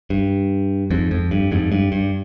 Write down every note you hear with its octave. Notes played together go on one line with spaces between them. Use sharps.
G2
F2 G#2
F2
G2
F2 G#2
G2
G2